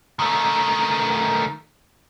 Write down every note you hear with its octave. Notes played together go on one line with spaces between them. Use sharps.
D#3 A3